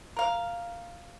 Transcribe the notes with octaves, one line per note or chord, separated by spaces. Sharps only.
A#4 F5